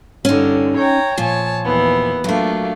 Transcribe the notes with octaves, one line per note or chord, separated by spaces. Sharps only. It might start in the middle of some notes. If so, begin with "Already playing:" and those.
G2 D3 C#4 D#4
C#5 G5 A#5
A#2 F3 C#5 G#5 A5
D#2 E3 B3
F#3 A3 A#3 D4 F4